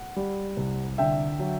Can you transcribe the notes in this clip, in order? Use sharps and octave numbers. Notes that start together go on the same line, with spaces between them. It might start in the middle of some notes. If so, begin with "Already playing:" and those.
Already playing: F#5
G3
C2
D3 E5 G5
F#3